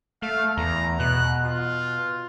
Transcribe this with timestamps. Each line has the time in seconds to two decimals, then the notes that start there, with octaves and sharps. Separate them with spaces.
0.22 A3 F5
0.57 E2 A#5
1.00 B2 F#6
1.44 F4